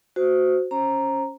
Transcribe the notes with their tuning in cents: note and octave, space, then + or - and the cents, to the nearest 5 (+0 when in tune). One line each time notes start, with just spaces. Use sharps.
F#4 +0 C5 -15
C#4 +0 C5 +30 A#5 +0